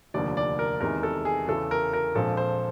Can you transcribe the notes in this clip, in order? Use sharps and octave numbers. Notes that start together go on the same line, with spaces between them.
F1 D#2 D3 F3 A#3 D5
D5
A#4
E2 C3 D#3 G#3 A#4
A4
G#4
E2 C#3 E3 A4
A#4
A#4
A#1 A#2 F3 G#3 C4 A4
C5